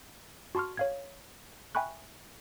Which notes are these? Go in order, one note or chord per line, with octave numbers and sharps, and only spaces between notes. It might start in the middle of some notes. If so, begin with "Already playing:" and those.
F#4 A5 C6 C#6 F6
C#5 F5 G#6
E5 G5 G#5 B5 C#6 F#6